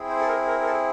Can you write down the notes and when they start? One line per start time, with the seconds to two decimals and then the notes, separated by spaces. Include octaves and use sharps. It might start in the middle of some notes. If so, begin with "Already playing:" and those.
Already playing: C4 E4 G#4
0.09 C5
0.20 A4
0.27 A#4
0.47 A#4
0.61 A#4
0.66 A4